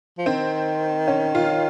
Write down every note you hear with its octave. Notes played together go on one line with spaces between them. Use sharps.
F3
D#3 C4
C#4
F4